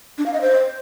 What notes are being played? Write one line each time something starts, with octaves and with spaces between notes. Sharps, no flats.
D4
F5
D#5
C5